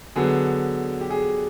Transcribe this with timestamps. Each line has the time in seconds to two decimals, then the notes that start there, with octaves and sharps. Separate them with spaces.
0.16 D3 F#3 B3 G#4
1.01 G4
1.10 G#4